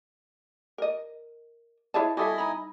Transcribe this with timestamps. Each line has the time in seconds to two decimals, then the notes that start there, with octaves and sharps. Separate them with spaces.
0.78 A#4 D#5
1.94 E4 G#4 B4 C#5 D#5 A5
2.17 G3 E4 F#4 A4 D#5 E5 G#5
2.38 D#4 A#5 B5